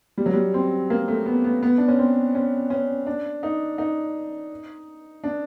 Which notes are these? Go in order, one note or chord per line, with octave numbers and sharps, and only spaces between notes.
G3
F#3
G3
C4
A#3
A3
B3
B3
B3
D4
C#4
C4
C#4
C#4
D4
D#4
D#4
D4